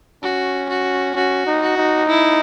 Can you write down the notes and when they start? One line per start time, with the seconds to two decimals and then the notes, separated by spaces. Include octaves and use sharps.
0.23 C#4 F#4
0.69 F#4
1.15 C#4 F#4
1.46 D#4
1.62 F#4
1.77 D#4
2.08 E4